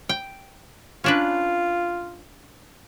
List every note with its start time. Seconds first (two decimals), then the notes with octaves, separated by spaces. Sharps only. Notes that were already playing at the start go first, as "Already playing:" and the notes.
0.09 G5
1.04 C#4 D4 F4 B4